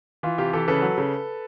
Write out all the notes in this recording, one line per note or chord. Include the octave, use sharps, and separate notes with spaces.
E3 F4
C3 F4 G4
E3 G4 A4
C#3 A4 B4
F#3
C#3